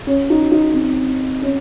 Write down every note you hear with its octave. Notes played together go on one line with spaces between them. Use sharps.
C#4
D#4
D#4
C4
C#4